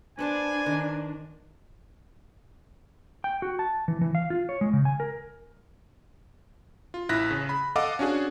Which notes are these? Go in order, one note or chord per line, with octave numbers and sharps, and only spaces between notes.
D4 B4 C5 G#5 A5
D#3
G5
F#4
A5
E3
E3
F5
F4
C#5
G#3
C#3
G#5
A#4
F4
A1 E4 F#6 A#6 B6
C#3
B5
A4 D#5 F5 F#5 D6
C#4 D4 F#4 G#4